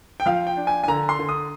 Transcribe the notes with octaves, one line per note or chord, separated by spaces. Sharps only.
G5
F3 F5
G5
D4
G#5
G#5
D3 A#5
C6
D3
D#6